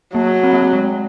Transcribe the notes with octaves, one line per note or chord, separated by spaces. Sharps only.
F#3 A#3
C4
A#3
A3
G#3